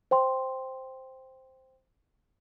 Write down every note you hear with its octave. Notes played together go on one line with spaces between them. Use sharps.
C5 G5 C6